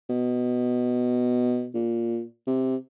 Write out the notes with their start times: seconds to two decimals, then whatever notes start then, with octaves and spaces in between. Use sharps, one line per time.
0.10 B2
1.74 A#2
2.47 C3